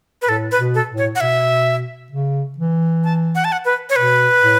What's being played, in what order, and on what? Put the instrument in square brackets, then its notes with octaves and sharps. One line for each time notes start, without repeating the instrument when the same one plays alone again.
[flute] B4
[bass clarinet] A2 [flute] A4
[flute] B4
[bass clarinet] B2
[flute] A4
[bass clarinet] A2
[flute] C#5
F#5
[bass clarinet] B2 [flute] E5
[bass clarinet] C#3
E3
[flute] A5
F#5
A5
F#5
B4
C#5
[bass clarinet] B2 [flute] B4
[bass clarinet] A2